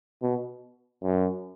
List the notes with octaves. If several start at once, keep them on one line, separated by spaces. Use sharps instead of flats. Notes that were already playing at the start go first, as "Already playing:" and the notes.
B2
F#2